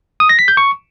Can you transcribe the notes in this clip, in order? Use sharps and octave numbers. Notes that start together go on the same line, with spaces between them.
D#6
A#6
B6
G6
C#6